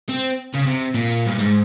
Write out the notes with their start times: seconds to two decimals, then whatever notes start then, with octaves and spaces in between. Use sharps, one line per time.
0.09 C4
0.55 C#3
0.67 C3
0.95 A#2
1.27 G2
1.39 G#2